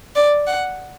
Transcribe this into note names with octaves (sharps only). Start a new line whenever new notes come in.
D5
F#5